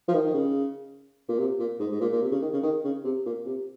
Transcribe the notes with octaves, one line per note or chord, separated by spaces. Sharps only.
F3
D#3
D#3
C#3
A#2
C3
A#2
G#2
G#2
A#2
A#2
C3
C#3
D#3
C#3
D#3
C#3
C3
A#2
C3